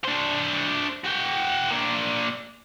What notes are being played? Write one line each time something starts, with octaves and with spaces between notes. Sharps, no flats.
D4 C5
F#4 G5
A#3 D4